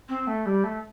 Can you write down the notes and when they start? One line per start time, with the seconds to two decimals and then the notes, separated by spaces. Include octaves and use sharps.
0.09 C4
0.27 A3
0.46 G3
0.64 A3